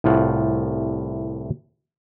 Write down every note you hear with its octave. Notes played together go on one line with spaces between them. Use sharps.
C2 A2 F4 F#5 G5